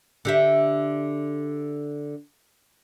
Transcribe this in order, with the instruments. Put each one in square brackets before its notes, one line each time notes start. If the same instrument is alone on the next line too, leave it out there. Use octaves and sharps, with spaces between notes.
[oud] D3 G4 E5